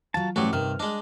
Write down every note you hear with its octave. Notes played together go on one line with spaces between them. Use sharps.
F#3 F4 A5
A1 G#2 F#3 G3 A3 F#4
G2 C3 D#3 F6
G#3 D4 D#5